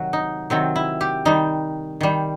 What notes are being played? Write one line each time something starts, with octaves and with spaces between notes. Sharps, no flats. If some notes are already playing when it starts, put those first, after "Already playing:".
Already playing: C3 D#3 F#3 F#4
D#4
C3 D#3 F#3 C4
E4
G4
D#3 G3 D#4
D#3 G3